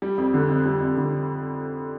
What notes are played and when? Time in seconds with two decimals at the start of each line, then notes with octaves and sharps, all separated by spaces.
0.02 G3
0.18 F2
0.34 D3
0.50 F2
0.66 G3
0.81 F2
0.97 D3